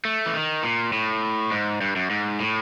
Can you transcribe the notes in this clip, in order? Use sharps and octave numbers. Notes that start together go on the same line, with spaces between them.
A3
E3
D#3
A#2
A2
G#2
G2
F#2
G#2
A2